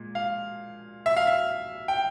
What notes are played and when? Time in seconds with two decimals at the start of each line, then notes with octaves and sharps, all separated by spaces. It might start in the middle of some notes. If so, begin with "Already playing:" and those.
Already playing: A#2 G#3
0.15 F5
1.06 E5
1.17 F5
1.27 E5
1.88 G5